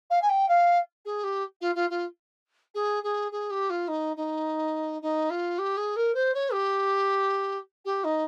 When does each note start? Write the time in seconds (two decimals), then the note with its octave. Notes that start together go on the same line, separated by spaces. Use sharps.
0.10 F5
0.21 G#5
0.29 G5
0.48 F5
1.05 G#4
1.23 G4
1.61 F4
1.75 F4
1.89 F4
2.74 G#4
3.03 G#4
3.31 G#4
3.50 G4
3.69 F4
3.87 D#4
4.16 D#4
5.01 D#4
5.30 F4
5.58 G4
5.77 G#4
5.96 A#4
6.14 C5
6.34 C#5
6.52 G4
7.84 G4
8.04 D#4